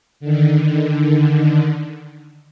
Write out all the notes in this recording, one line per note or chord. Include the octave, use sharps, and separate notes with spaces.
D3 D#3